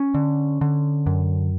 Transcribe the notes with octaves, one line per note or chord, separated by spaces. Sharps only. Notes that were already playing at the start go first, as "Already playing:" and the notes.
Already playing: C#4
D3
D3
F#2